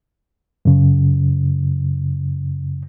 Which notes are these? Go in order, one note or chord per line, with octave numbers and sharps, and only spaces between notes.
F#2 C#3